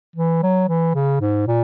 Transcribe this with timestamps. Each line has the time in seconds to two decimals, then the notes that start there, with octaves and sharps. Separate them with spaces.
0.16 E3
0.43 F#3
0.69 E3
0.95 C#3
1.21 G#2
1.47 A#2